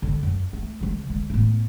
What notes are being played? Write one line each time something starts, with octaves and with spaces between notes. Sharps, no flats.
D3 D#3
F#2
A3
C#3 F3
D3 G#3
A2 B3